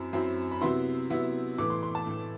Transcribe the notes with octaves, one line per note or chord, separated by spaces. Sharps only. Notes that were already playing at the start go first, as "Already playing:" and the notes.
Already playing: F#2 F#3 C4 E4
F#2 F#3 C4 E4
B5
C3 F#3 B3 E4 C6
C3 F#3 B3 E4
A2 E3 A3 D6
C6
C6
A5
A2 E3 A3